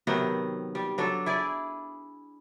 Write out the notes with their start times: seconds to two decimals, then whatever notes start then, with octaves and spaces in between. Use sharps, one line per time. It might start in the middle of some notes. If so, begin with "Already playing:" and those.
0.07 C3 D#3 F#3 B3
0.75 G3
0.98 F#3 D4 A4
1.26 E4 G#4 D5